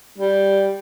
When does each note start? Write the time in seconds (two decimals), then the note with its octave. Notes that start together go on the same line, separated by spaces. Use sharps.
0.18 G3